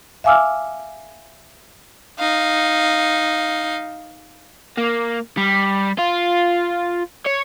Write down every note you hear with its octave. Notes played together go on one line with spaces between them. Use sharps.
E5 F5 G#5 D6 E6 F6
D#4 F5
A#3
G3
F4
C#5